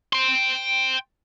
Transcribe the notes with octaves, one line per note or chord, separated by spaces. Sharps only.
G5 C6